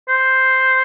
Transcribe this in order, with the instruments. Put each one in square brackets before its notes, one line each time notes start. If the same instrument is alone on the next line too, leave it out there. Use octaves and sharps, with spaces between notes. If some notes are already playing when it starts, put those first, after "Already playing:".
[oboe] C5